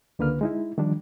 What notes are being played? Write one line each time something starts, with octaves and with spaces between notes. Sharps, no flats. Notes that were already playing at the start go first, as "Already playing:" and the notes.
C#2 D3 A#3 B4 F6
G#3 D#4 E4
D#3 F3 G3 D4